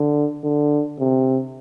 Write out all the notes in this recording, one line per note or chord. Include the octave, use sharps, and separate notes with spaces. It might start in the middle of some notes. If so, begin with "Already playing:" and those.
Already playing: D3
D3
C3